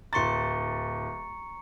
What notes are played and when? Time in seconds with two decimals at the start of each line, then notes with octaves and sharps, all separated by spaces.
0.13 D1 A#5 C6 C#6 A6 C#7